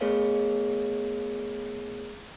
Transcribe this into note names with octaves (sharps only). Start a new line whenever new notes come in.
A3 B3 G#4 A#4 C#5 F5